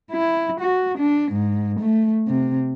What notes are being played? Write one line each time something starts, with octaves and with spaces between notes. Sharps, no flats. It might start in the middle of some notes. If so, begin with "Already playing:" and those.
E4
F#4
D4
G#2
A3
C3